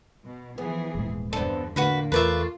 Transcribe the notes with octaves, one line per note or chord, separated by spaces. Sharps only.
B2
E3 F3 B3 G#4
D#1 G#2
E2 G2 D3 B3 C4 A4 D5
A2 D3 A#3 F4 F#4 B4 B5
E2 A3 F4 A#4 B4 D5 E5